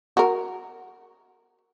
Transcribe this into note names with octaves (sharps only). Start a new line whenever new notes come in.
F#4 A#4